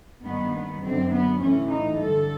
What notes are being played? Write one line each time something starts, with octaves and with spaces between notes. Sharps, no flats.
G2 D#3 B3
B3
F#2 D3 C4
B3
A2 E3 C#4
D#4
G2 D3 A4